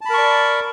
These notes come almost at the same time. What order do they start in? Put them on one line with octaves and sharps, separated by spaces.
A5 B5 A#4 C#6 D5